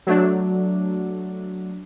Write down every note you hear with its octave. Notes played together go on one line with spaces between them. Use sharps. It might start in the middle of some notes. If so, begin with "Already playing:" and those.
F#3 A3 D4